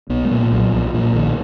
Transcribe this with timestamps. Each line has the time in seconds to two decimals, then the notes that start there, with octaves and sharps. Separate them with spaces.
0.09 B1 B3
0.25 G#3
0.31 A#2 A#3
0.52 B1 F#3
0.72 B1 F3
0.94 A#2 F3
1.15 B1 D#3